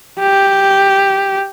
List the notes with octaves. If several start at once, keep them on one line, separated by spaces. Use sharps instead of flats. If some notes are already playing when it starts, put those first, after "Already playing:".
G4